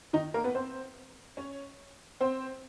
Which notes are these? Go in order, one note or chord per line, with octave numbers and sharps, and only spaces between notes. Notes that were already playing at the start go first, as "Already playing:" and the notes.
D#3 D#4
A#3 A#4
B3 B4
C4 C5
C#4 C#5
C4 C5